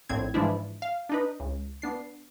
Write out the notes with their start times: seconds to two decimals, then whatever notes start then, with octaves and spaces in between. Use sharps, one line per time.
0.09 A#1 A2 C4 G#6
0.34 G#2 E3 F3 G#3 D4 E4
0.82 F5
1.09 D4 D#4 B4
1.40 C#2
1.82 B3 D4 C7